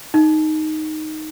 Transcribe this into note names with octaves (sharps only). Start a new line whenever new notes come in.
D#4